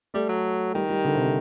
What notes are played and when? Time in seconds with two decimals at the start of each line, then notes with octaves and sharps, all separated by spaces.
0.14 G3 A3
0.29 F#3
0.75 D#3 G3
0.90 G3
1.05 D3
1.15 C3
1.25 C3